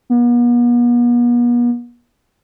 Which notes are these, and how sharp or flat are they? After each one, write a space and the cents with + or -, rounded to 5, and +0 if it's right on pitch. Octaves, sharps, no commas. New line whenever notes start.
B3 -45